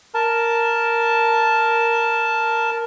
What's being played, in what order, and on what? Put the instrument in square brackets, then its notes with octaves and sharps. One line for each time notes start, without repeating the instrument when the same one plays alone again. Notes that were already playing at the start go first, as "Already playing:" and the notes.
[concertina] A#4 A5